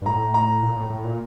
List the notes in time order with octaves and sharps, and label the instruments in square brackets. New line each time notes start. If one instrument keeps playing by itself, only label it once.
[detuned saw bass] G2
[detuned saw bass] A2 [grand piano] A#5
[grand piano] A#5
[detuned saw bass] A#2
A2
A2
A#2